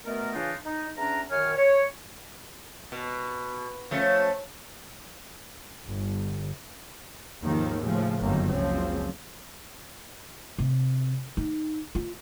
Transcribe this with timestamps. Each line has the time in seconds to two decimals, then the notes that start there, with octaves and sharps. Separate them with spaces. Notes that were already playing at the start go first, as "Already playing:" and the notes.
0.05 B2 A3 B3 A#4
0.34 C#3 E3 D4 D#4 F4
0.64 D#4
0.97 E2 C#4 D4 A#5
1.31 F#2 D#3 C#5 G#5 F6
1.56 C#5
2.92 B2
3.91 F3 A3 C#4
5.88 G1
7.41 D#2 G#2 D#3 F3
7.82 A2 C#3 F3
8.22 G1 F#2 D#3 A#3
8.50 F#1 C#2 C#3 F3 C4 C#4
10.59 C3
11.37 D#4
11.95 F4